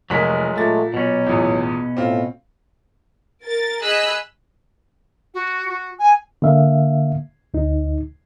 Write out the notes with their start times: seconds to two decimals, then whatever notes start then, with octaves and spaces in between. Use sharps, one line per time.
0.10 F1 F#3 G#3 A#4 B6
0.55 A#2 A3 A6
0.94 B2 F#3 C#4
1.24 A1 E2 A#2
1.97 A2 C4 F4
3.44 A#4 A6
3.82 G#4 D#5 B5 E6 F#6
5.34 F#4
5.68 F#4
5.98 G#5
6.42 D3 A#3 E5 F5
7.54 D2 D#4